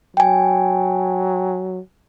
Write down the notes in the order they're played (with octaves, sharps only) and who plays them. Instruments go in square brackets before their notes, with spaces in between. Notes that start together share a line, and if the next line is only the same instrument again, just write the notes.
[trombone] F#3 [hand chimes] G5 G#5